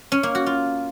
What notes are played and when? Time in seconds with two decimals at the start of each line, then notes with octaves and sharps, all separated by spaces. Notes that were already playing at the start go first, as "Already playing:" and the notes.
0.12 C#4
0.23 A#3
0.35 F#4
0.46 F4